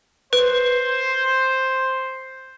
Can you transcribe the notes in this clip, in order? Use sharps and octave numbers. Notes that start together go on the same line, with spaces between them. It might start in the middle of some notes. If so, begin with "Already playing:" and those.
B4 C5